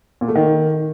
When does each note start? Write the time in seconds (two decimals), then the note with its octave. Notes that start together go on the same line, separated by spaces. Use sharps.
0.21 A#2
0.28 A3
0.35 D#3